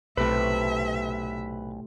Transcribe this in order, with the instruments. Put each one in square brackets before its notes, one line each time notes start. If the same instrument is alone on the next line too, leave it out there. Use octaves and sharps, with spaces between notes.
[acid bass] B1 [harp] A2 C3 [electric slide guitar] B4 [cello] E5